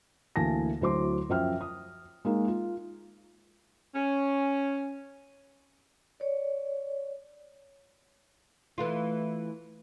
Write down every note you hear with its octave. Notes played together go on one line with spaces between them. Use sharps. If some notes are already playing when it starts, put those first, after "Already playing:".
D2 E3 A#3 G#5 A5 A#6
D2 F#3 E4 C5 C6 D6
F#2 F3 C5 E5 G5 F6
D#6
G#3 A#3 D#4
F4
C#4
C#5 D5
E3 A3 F4